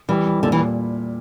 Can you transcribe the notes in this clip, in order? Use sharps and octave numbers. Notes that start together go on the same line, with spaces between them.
E3 G3
G3
A#2 D3
E3